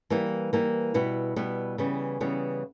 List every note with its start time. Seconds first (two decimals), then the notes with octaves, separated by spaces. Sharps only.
0.10 E3 G3 A#3
0.53 E3 G3 A#3
0.94 B2 G3 B3 E4
1.36 B2 G3 B3 E4
1.78 C#3 E3 G3 B3
2.20 C#3 E3 G3 B3